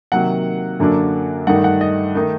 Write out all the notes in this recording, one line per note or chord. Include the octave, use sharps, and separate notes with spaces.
C3 D#3 F#3 A#3 F#5
F#2 D3 F#3 A#3 D4
G2 D#3 A3 D#4 F#5
F#5
D#5
D#3 A3 D#4